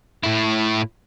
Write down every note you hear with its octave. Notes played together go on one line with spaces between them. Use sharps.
A2 E4